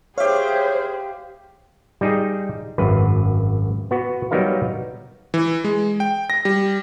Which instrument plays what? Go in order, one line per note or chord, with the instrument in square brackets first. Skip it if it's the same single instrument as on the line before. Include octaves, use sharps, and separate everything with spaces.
[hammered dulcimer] G4 F5 [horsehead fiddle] G#4 C5 [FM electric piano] C#5 E5
[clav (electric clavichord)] G3 D#4 G#4
G#1 F#2 B4
B3 F#4
F#3 G3 B3 D#4 A#4 F5
[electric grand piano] E3
G#3
G5
A#6
G3